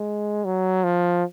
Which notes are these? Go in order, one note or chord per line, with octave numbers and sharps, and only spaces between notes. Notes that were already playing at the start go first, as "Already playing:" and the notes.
Already playing: G#3
F#3
F3